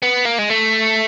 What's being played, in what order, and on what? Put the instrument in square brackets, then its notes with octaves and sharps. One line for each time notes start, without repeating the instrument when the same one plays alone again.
[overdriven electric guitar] B3
A#3
G#3
A3